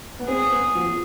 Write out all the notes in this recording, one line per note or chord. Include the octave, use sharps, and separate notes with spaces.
B3
C4 G#4
B3
F3